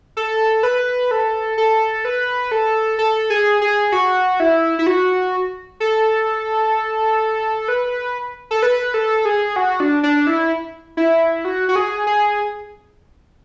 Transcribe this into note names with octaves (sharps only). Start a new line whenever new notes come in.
A4
B4
A4
A4
B4
A4
A4
G#4
G#4
F#4
E4
E4
F#4
A4
B4
A4
B4
A4
G#4
F#4
D4
D4
E4
E4
F#4
F#4
G#4
G#4